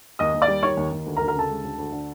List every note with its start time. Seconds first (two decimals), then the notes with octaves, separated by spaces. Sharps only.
0.19 D#2 D#5 D#6
0.34 D#2
0.42 D5 D6
0.48 G3
0.63 D#3 C#5 C#6
0.77 D#2
0.92 D#2
1.06 D2
1.17 A#4 A#5
1.21 D2
1.28 A#4 A#5
1.35 C#3 A4 A5
1.49 G#3
1.63 D2
1.78 D2
1.92 D3